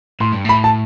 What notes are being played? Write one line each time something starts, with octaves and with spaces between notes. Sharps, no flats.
A2 C6
G2
A2 B5
A5